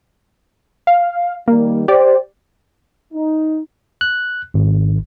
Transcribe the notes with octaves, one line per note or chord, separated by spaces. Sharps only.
F5
D#3 G3 A#3
G4 C5 D5
D#4
F#6
G#1